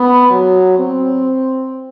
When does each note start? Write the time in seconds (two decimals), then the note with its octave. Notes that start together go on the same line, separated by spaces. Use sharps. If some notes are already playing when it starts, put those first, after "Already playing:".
Already playing: B3
0.30 F#3
0.78 C4